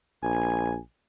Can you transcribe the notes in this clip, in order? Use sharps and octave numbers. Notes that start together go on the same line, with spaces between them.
A#1 G#5